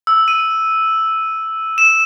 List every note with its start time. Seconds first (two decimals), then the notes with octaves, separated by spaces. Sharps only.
0.07 E6
0.28 D#7
1.78 E7